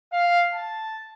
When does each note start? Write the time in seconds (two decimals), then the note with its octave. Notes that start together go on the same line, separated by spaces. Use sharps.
0.12 F5
0.53 A5